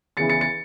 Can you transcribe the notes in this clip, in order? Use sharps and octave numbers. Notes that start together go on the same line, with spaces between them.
E2 C#3 E3 A6 C#7
A6 C#7
A6 C#7